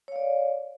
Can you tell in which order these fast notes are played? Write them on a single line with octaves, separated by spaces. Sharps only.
C#5 F5 D5